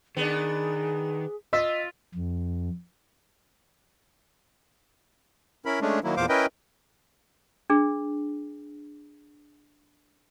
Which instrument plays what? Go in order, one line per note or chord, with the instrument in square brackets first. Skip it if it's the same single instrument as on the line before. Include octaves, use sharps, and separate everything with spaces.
[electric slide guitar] D#3 [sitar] B3 D4 [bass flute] G#4
[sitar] F4 [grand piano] D#5 E6 B6
[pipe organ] F2
[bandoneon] C#4 E4 A#4 B5
G#3 A3 C#4 D4
D#3 F#3 A#3 E4
E2 A#2 C5 F5 D6
C#4 E4 A#4 B4 D#5 G5
[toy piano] D4 G#4